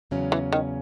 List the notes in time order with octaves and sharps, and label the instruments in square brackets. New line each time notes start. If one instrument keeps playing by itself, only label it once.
[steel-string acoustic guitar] E2 C#3 F#3 C#4
[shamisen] E3
D#3